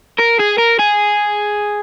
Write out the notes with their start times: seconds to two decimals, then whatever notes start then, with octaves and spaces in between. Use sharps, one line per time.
0.19 A#4
0.40 G#4
0.59 A#4
0.79 G#4